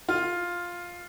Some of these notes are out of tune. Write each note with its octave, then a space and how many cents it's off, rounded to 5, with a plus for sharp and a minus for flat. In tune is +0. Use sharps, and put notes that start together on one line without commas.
F4 +5